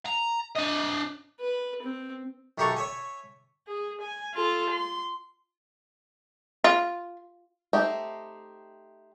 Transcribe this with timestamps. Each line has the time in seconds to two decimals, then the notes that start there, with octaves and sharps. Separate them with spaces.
0.05 A#5
0.56 D4 D#5
1.40 B4
1.82 C4
2.58 B1 F#2 G4 A4 A#5 C#6
2.77 C#5 E5 G#5
3.68 G#4
4.02 G#5
4.35 F4 A4
4.71 C6
6.64 F4
7.73 A3 C4 D#4 G4